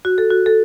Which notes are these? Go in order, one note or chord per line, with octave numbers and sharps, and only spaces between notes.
F#4
A4
F#4
A4